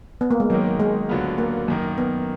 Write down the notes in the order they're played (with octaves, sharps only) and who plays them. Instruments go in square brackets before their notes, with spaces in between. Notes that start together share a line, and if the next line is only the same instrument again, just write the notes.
[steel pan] B3
A#3
G#3
[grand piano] G#2 D#3 A#3 [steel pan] F#3
[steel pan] G#3
[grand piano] D2 D3 F#3 B3 F4
[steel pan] A#3
[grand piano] F#2 D#3 A#3
[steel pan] B3